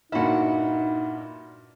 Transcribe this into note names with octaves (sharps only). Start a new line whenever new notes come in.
G2 A#2 D#4 E4 F#4